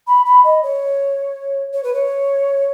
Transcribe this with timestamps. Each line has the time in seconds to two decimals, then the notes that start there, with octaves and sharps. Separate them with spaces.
0.07 B5
0.25 B5
0.44 D#5
0.63 C#5
1.73 C#5
1.83 B4
1.93 C#5